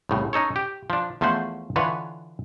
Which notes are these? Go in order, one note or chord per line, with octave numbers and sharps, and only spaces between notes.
C2 A2 C#3
C#4 D#4 A4 C#5
G4
F3 D4
E2 F3 A3 C#4 C5 F#5
D3 E3 F4 B4 C#5